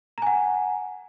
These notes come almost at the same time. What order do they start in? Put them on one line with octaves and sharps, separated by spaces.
A#5 G#5 F#5